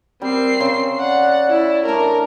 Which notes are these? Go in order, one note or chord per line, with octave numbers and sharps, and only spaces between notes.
G3 C4 A#4 C7
C#3 C6
D5 F#5
E4
A3 D4 A#4